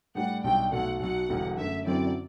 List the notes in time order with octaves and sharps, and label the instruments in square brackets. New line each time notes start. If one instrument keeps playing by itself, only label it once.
[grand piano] A2 G3 D4 [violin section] F#5
[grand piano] B1 B2 G3 D4 [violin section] G5
[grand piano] B1 B2 A3 [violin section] F#5
[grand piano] B1 B2 F#3 [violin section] F#5
[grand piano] E1 E2 D3 G3
[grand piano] F#2 D3 A3 [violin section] E5
[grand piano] F#2 D3 F#3 C4 E4 [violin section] D5